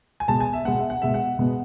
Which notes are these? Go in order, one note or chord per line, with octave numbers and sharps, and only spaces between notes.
G#5
B2 G#3 B3 A5
G#5
E5
B2 G#3 B3 F#5
E5
F#5
B2 G#3 B3 E5
F#5
B2 G#3 B3